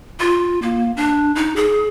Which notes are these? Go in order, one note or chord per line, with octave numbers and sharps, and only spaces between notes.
F4
A#3
D4
D#4
G#4